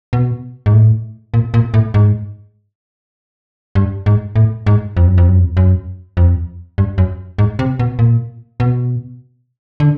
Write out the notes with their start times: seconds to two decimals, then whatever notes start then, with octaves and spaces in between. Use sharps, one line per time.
0.13 B2
0.66 G#2
0.73 A2
1.34 A#2
1.54 A#2
1.74 A2
1.94 G#2
3.75 G2
4.06 G#2
4.36 A2
4.66 G#2
4.97 F2
5.07 F#2
5.18 F2
5.28 F#2
5.39 F2
5.57 F#2
6.17 F2
6.78 G2
6.98 F#2
7.38 G#2
7.59 C3
7.79 B2
7.99 A#2
8.60 B2
9.80 D3